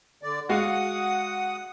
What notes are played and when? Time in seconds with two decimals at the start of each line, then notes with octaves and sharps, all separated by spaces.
0.23 D3 D5
0.49 G#3 F#4 F5 F#5 D#6